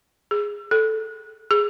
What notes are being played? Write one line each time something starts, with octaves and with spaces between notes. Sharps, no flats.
G#4
A4
G#4